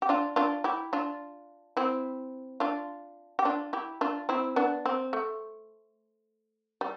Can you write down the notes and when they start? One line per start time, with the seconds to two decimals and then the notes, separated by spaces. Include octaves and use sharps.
0.02 G4
0.09 D4 F4
0.36 D4 F4
0.64 E4 G4
0.93 D4 F4
1.77 C4 E4
2.60 D4 F4
3.39 G4
3.45 D4 F4
3.73 E4 G4
4.01 D4 F4
4.29 C4 E4
4.56 B3 D4
4.86 C4
5.13 A3
6.81 G3